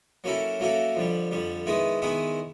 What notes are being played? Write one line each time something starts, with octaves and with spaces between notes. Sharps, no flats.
F#3 A#3 C#4 E4 A4
F#3 A#3 C#4 E4 A4
F2 D3 G3
F2 D3 G3
D#3 G#3 B3 E4 G#4
D#3 G#3 B3 E4 G#4